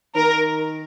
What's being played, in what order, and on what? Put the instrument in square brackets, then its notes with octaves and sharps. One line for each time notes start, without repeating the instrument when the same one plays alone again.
[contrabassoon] D#3 [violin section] A#4